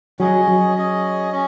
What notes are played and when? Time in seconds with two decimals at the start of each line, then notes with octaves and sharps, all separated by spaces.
0.19 F#3 C#4 G#4 D#5
0.48 F#3
0.76 C#4 G#4 D#5
1.32 C#4